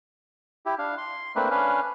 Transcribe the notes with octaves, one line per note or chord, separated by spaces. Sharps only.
E4 G4
D4 F5
C6
A3 A#3 C4 D4 B4
C#4 D4 B4 F5